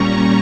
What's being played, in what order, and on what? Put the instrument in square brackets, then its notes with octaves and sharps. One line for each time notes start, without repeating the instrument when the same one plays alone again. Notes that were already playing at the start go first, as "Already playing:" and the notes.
Already playing: [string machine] A#2 G3 C#4 A#5 C#6